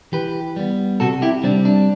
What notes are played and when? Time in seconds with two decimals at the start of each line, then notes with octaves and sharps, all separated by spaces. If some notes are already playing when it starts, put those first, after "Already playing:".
0.12 E3 G4 B4
0.56 G3 B3
1.00 C3 F#4 A4
1.22 E4 G4
1.44 G3 C4 D4
1.65 D4